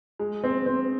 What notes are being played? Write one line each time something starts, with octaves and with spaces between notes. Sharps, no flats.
G#3
C4
C4